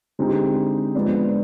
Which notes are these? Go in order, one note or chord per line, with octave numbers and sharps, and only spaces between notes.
D3 G#3 C4 D#4 G4
G#2 F3 B3 D4